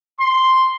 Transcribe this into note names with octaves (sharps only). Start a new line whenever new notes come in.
C6